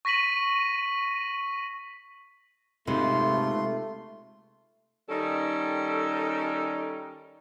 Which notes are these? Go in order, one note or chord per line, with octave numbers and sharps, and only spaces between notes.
C#6 A#6 B6 D#7 F#7
C3 G#3 A3 D#4 F4 B4 C6
D#3 G3 C#4 D#4 A4